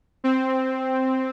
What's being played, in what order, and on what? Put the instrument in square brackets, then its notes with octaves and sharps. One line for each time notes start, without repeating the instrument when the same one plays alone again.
[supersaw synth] C4